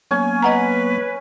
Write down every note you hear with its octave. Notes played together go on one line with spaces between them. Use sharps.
F#3 A#3 B3 C#4 G#5
B4 D#5 F#5 A#5